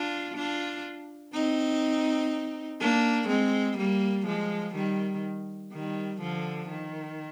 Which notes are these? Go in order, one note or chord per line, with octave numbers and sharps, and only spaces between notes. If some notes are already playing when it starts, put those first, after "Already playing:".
Already playing: D4 F4
D4 F4
C4 D#4
A#3 D4
G#3 C4
G3 A#3
F3 G#3
D#3 G3
D#3 G3
D3 F3
D#3